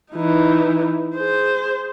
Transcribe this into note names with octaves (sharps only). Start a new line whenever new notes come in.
E3 D#4
G#4 C5